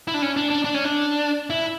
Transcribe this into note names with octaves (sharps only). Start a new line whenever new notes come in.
E4
D4
C#4
D4
D4
D4
C#4
D4
E4